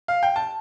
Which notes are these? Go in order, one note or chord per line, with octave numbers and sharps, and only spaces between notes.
F5
G5
A5